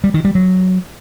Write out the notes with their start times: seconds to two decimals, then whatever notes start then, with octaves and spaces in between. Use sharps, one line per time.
0.04 G3
0.14 D#3
0.25 G3
0.35 F#3